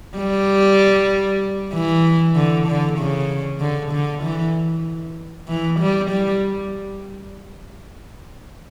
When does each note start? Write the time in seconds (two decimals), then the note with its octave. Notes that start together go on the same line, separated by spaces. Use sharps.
0.17 G3
1.74 E3
2.36 D3
2.67 D3
2.98 C#3
3.61 D3
3.92 D3
4.23 E3
5.48 E3
5.80 G3
6.10 G3